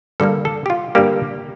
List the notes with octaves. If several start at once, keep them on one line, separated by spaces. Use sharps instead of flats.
G2 D3 G3 A#3 A4
A4
G4
F4
G2 D3 G3 A#3 G4